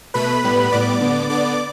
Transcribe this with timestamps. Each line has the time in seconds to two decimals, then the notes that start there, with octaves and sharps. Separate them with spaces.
0.14 B2 A3 B4 B5
0.43 A2 G3 B3
0.72 A2 G3 B3 D5 D6
1.01 D3 B3
1.30 D3 B3 D5 D6